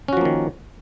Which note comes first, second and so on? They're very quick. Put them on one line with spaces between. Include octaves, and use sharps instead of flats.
C#4 F#4 F3 A#3 D#3